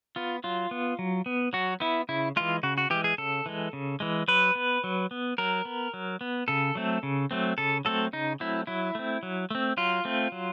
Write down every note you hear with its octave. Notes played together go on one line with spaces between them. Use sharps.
B3 F4
F#3 F4
B3
F#3
B3
F#3 F#4
B3 E4
C#3 E4
E3 G#3 F4
C#3 F#4
F#4
E3 G#3 G4
G#4
C#3 A4
E3 G#3
C#3
E3 G#3
F#3 B4
B3
F#3
B3
F#3 A#4
B3
F#3
B3
C#3 A4
F#3 A3 C4
C#3
F#3 A3 C4
C#3 A4
F#3 A3 C4 A4
C#3 D#4
F#3 A3 C4 E4
F#3 E4
A3 C4
F#3
A3 C4
F#3 F4
A3 C4
F#3